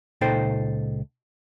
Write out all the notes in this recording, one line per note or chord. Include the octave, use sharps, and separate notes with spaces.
C#2 A#2 D#4 A4 C5 G5